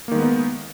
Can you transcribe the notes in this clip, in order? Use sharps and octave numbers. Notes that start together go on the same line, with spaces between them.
D#3 G#3 A#3 B3 D#4